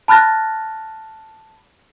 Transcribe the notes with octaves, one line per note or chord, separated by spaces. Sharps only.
A5 B5 F6 F#6 A6 A#6